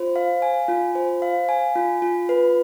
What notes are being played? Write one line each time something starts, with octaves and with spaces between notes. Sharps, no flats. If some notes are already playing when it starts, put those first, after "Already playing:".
Already playing: F4 C5
F5
G#5
F4
C5
F5
G#5
F4
F4
B4